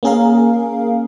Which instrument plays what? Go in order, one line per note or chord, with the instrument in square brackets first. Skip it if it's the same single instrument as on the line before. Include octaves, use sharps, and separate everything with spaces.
[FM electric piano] A#3 C#4 G#4 A#4 F5